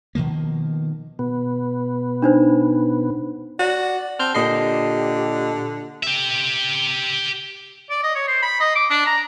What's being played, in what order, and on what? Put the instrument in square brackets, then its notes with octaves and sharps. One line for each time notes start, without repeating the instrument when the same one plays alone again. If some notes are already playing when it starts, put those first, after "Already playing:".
[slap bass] B2 D#3 F3 A#3
[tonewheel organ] B2 B3
[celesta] D4 D#4 C5
[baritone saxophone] F#4 [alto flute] D5
[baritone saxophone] C4 [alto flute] A5 [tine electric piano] F6 G6
[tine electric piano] A#2 D#5 C7 [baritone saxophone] D3 [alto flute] G4
[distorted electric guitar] G4 E5
[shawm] D5
D#5
C#5
C5
B5
D#5
D6
D4
A#5